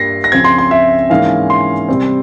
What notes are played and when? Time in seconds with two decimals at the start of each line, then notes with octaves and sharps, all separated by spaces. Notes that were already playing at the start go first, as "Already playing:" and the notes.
Already playing: G2 G3 A#3 A#6 C7
0.24 A#6
0.32 C#2 C#3 F3 C4 G#6
0.44 C6
0.59 C6
0.71 E5
1.10 G#2 E3 A#3 C#4 F5
1.50 C6
1.89 C3 G3 C4